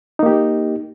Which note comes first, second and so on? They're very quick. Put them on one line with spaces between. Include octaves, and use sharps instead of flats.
D#4 A#3 G4